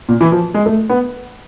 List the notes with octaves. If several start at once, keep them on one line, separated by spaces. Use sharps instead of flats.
A#2
E3
F3
G#3
A3
B3